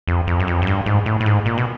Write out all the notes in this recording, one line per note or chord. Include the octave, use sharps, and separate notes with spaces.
F2
F2
F#2
F2
F#2
G2
G#2
A2
A2
G#2
A#2
B2